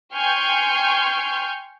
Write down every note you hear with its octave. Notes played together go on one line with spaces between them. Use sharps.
G5 G#5 C6 C#6 F6 G6